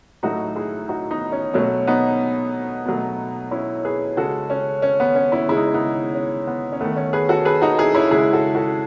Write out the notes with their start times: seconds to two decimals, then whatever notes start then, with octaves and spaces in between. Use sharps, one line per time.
0.23 A2 F#3 A3 D#4 F#4
0.56 E4 G#4
0.88 D#4 F#4
1.10 B3 D#4
1.32 C#4
1.54 B2 F#3 A3 C#4
1.87 B3 D#4
2.85 B2 F#3 A3
3.51 C#4 E4
3.84 G#4 B4
4.17 C#3 G#3 F#4 A4
4.50 C#4
4.82 C#4
5.00 B3
5.15 C#4
5.32 C#4 E4
5.48 C#3 G#3 E4
5.57 D#4
5.66 C#4
5.74 B3 D#4
6.14 C#4
6.47 B3
6.72 C#4
6.81 D#3 A3 B3
6.96 C#4
7.13 G#4 B4
7.29 F#4 A4
7.45 G#4 B4
7.62 D#4 F#4
7.78 E4 G#4
7.95 C#4 E4
8.11 C#3 G#3 E4 G#4
8.33 F#4 A4
8.55 F#4 A4